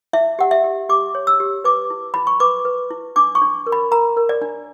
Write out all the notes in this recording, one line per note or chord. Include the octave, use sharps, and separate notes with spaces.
E4 E5
G4 F#5
E5
G4
G4 D6
C#5
E6
G4
B4 D6
E4
E4 B5
C#6
B4 D6
B4
E4
D4 D6
C#6
D4
A#4
B5
A#4 A#5
A#4
D5
D4